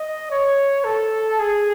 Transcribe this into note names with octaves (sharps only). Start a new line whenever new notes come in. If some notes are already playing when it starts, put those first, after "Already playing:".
Already playing: D#5
C#5
A4
G#4